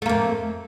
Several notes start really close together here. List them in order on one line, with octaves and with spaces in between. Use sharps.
A3 A#3 F2